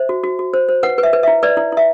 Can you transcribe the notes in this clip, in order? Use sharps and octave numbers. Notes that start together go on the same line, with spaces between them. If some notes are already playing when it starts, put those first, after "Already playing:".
Already playing: C5 E5
F#4
F#4
F#4
C5
C5
B4 F#5
B4
E5
B4
E4 E5
B4 D5
E4
E4 E5